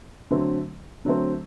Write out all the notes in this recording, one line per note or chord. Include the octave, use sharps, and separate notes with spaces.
D3 F#3 A3 C4
D3 F#3 A3 C4